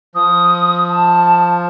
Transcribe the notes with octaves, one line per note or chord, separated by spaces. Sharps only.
F3 D#6
A5